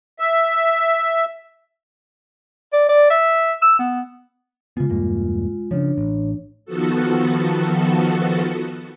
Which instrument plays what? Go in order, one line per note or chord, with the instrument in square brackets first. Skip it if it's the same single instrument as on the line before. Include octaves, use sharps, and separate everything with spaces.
[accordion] E5
[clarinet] D5
D5
E5
E6
B3
[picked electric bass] C#3 B3 [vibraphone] G#3 F4
[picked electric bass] E1 G2 A#3
[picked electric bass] C#3 F3 [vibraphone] D4 C#5
[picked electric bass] A1
[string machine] D#3 F3 B3 F#4 A4